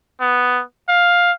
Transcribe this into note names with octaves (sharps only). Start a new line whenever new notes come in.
B3
F5